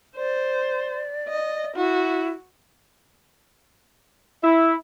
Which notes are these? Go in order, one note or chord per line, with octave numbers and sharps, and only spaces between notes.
C5 D5
D#5
E4 F#4
E4